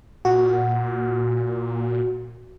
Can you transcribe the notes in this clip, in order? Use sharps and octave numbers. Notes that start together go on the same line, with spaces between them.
A#2 F#4